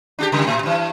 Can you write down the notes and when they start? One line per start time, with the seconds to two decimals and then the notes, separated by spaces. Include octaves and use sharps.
0.19 D4 F#4 G4
0.32 C#3 G3
0.47 A2
0.63 G2 E3